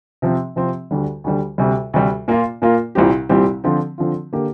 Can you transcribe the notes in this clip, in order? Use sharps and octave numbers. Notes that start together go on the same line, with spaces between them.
C3 F3 C4
C3 F3 C4
D2 D3 G3
D2 D3 G3
D2 C3 G3
D2 C3 G3
A#2 A#3 F4
A#2 A#3 F4
C2 A#2 G3 C4 G4
C2 A#2 G3 C4 G4
D3 F3 C4 F4
D3 F3 C4 F4
D3 A#3 G4